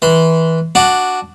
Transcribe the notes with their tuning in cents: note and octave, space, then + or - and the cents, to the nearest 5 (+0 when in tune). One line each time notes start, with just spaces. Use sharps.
E3 -20 C6 -20
D4 +0 F#4 +0